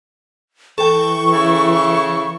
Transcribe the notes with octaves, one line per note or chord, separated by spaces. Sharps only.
E3 A4 G5 C#6
C#3 E4